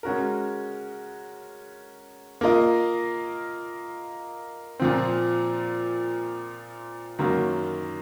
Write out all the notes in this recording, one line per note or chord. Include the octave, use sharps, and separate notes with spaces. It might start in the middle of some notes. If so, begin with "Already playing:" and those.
G#3 C#4 F#4 A#4
A#3 F4 A#4 D#5
A#2 F3 C4
F#2 D#3 F#3 A#3